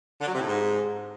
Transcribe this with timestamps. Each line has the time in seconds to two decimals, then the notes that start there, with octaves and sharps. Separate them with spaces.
0.21 D3
0.28 F#3
0.34 C3
0.40 A2
0.47 G#2